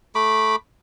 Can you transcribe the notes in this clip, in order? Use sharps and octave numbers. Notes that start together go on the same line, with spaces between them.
A3 B5 D6